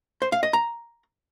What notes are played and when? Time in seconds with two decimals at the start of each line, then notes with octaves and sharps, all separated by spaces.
0.22 C5
0.32 F5
0.43 D#5
0.53 A#5